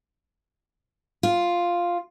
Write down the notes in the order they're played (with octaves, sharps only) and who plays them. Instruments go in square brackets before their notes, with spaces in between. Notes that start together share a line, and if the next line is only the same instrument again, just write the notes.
[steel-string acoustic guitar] F4